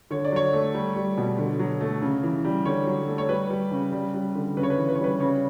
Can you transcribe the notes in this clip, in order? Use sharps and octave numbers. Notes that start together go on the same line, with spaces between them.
D3 C#5
D5
F#3 C#5
A3
G3
G3
B2
D3
F#3
A3
C#3
E3
G3
D3 C#5
F#3
A3
C#5
G3 B4
G3
C#3
G3
G3
D3
C#3 B4
C#5
B4
E3
B4
C#5
G3
B4
C#3 C#5